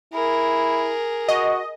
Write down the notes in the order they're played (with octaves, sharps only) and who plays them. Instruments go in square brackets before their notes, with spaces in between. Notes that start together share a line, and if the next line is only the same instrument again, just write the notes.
[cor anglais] E4 [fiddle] G#4 A#4
[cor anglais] F#4 [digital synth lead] D#5